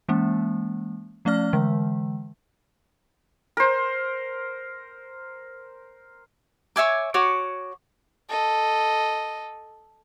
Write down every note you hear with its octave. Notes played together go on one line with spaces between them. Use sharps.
E3 G#3 A#3 C#4
F3 A3 C#4 D5 F6
D3 E3 G#3
A#4 C5
C#5 E5 G#5 D6
F#4 C#5 D6
A4 D#5